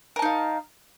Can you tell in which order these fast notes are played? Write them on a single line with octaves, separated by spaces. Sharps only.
A#4 A5 D#4 F5